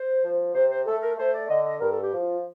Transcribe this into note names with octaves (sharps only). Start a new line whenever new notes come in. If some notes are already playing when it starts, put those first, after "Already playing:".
Already playing: C5
F3
C3 C5
C5
A3 A4
A#4
A3 C5
D5
D3 D#5
D#5
G2 A#4
A4
G4
F3
F4